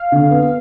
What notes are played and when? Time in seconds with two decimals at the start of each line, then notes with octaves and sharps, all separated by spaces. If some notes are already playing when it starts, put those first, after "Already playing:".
Already playing: F5
0.12 D3
0.31 B3